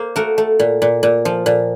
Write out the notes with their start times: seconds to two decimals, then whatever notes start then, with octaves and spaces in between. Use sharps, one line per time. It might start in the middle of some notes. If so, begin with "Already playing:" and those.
Already playing: A#3 C5
0.16 A3 F#4 A#4
0.38 A3
0.59 A#2
0.82 A#2
1.03 A#2
1.25 F3
1.46 A#2